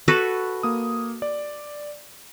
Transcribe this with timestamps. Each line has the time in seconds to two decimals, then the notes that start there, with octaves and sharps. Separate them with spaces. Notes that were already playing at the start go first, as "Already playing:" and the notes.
0.08 F#4 A4 B4
0.63 A#3 D#6
1.22 D5